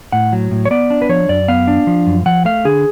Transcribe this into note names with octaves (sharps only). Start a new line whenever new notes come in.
A2 F#5
F#3
A2
C#5
B3 D5
D4
B4
F3 C#5
F#2 D5
B3 F5
D4
F3
F#2
F3 F#5
A3 F5
D3 G#4